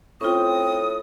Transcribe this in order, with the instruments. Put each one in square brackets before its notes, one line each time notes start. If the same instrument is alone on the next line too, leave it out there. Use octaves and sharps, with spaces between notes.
[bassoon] A2 [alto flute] C4 [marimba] C#4 F4 [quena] D#6